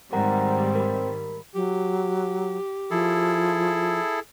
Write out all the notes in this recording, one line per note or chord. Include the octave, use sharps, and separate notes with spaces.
G#2 D#3 G3 C4 A#4 F#5 A#5
A#4 B5
F#3 G4
F3 E4 G#4 A4